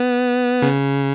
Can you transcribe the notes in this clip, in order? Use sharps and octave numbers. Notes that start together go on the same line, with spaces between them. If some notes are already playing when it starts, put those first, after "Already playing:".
Already playing: B3
C#3